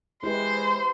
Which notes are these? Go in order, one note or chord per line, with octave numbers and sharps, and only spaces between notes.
G#3 E4 G4 B4 C5